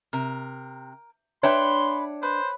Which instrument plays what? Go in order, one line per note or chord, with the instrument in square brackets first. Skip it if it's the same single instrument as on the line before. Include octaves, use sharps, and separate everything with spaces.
[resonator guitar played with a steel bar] C3 [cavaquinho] A#4
[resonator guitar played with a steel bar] D4 E5 G5 [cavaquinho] B4 B5 [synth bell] C#5 [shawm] C6
[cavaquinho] B4 [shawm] C5